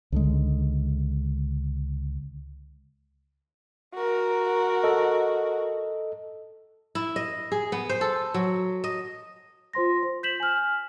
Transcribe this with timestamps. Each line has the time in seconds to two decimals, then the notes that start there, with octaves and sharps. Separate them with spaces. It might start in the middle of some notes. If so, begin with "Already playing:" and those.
0.12 C#2 D3 G#3
3.94 F#4 A#4
4.84 A4 D#5
6.95 E4
7.16 D#5
7.52 G#4
7.72 B3
7.89 C5
8.01 A4
8.34 F#3
8.84 D#5
9.73 F4 C5 C6 A#6
10.03 C5
10.23 G6 B6 E7 F#7
10.40 G#5 F6